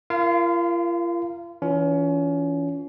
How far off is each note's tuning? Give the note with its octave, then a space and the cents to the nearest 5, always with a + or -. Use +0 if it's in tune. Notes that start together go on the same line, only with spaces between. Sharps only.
F4 -40 A#4 +0 F5 -5
E3 +0 C#4 +30 F4 +0